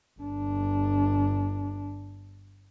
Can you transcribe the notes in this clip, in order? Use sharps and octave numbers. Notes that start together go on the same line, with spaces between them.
G1 D4